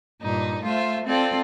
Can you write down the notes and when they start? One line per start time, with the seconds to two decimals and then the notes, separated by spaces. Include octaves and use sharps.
0.21 G2 A#2 D#4
0.63 A3 F4 C5 E5
1.06 C4 F4 A4 D5